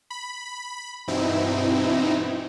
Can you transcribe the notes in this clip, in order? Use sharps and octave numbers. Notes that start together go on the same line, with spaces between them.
B5
G2 B2 E3 C4 D#4 E4